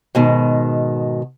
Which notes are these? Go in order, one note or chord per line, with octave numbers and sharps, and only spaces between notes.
G#2 B2 D#3